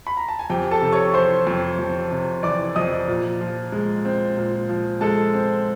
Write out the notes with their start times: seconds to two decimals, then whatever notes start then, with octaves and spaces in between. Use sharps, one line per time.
0.07 B5
0.17 A#5
0.28 A5
0.39 G#5
0.50 F2 G4 G5
0.71 A4 A5
0.82 C3
0.92 C#5 C#6
1.14 E3 C5 C6
1.47 F2
1.79 F2
2.11 C3
2.43 E3 D5 D6
2.75 F2 D#5 D#6
3.08 A#2
3.41 F3
3.72 G#3
4.05 C4
4.37 A#2
4.69 F3
5.01 G#3 A4 A5
5.34 C4